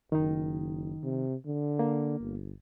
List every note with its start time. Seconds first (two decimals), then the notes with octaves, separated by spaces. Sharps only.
0.12 F#1 D#3 D#4
1.03 C3
1.46 D3
1.79 A#3
2.20 G1